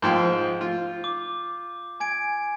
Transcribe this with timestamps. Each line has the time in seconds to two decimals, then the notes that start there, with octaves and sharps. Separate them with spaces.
0.02 G#2 F3 G5 G6
0.61 F4
1.04 D6
2.00 G#5 G#6 D7